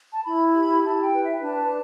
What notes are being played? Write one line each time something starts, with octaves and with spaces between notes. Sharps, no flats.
A5
E4 B5
G4
E4 A5
G5
B4
E5
D4 A5